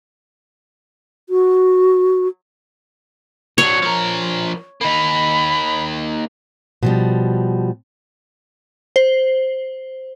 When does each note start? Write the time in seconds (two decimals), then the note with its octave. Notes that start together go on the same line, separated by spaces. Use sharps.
1.29 F#4
3.58 F#3 D4 C#5
3.83 F3 A#4
4.81 A#3 D#4 B5
6.83 B2 F3 G3
8.96 C5